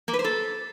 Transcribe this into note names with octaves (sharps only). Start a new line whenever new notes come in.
A#3
B4
C5
A4